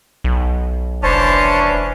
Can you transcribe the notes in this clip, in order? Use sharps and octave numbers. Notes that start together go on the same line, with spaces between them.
B1
F1 E3 C#4 D4 C5 C#5 A5